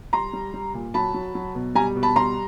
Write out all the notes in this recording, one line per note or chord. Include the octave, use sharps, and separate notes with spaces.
G3 A#5 C6
G3
G3
A#2
F#3 A5 B5
F#3
F#3
B2
G3 G#5 A#5
B2
A5 B5
G3 A#5 C6